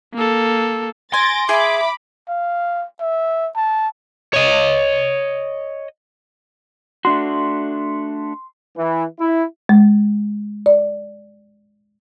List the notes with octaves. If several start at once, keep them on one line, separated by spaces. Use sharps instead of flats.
A#3 A4
G#5 C6 A6 A#6 D7
G#4 E5 B5 D6
F5
E5
A5
C#5 D#5
A3 D4 F#4 C6
E3
E4
G#3
D5